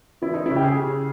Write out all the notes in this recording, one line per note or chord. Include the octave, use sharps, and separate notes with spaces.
E3 E4
D#4
C#3 E4
G4
G#4
C#3